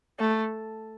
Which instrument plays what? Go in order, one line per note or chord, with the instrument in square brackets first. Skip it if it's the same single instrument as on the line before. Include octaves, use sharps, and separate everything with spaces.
[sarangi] A3